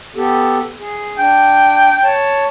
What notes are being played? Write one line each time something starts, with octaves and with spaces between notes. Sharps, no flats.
B3 G4 A4
G#4
D4 G5
C#5 A5